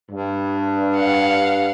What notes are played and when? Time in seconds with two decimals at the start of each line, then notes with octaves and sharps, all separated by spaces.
0.11 G2
0.95 F5 F#5